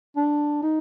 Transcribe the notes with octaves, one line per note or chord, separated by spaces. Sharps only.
D4
D#4